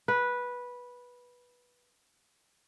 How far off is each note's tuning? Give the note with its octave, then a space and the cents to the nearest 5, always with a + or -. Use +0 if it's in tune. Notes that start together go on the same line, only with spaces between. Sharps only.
B4 -10